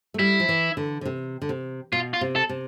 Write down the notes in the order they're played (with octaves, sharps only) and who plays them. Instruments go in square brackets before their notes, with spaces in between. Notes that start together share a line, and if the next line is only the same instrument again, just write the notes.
[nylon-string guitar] A3
[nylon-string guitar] G3 [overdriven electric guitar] E4
[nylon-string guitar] F3
E3
D3
D3
C3
D3
C3
[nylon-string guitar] B2 [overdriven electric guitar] F4
[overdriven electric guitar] F4
[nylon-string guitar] C3
[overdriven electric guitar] A4
[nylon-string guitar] C3